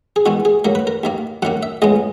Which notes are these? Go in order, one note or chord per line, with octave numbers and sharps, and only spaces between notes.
G#4
E2 D#3 G#3 B3 F#4
G#4
G#2 F#3 A#3 A#4
B4
A#4
D#2 D#3 A#3
F#2 D#3 A#3 F#5
E5
C#2 C#3 G#3 B3 D#5